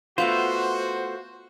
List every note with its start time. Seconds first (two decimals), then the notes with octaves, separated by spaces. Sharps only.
0.18 A3 B3 F4 F#4 C5